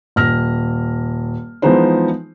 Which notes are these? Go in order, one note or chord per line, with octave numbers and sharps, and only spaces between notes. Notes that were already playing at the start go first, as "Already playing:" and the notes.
D#1 F6 A#6
E3 F3 G#3 B3 D#4 C5